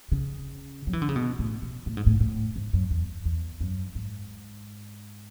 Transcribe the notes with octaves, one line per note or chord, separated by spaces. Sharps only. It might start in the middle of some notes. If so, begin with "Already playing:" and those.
C#3
F#3
E3
D3
C#3
B2
A2
B2
A2
G#2
A2
A2
G#2
F#2
E2
E2
F#2
G#2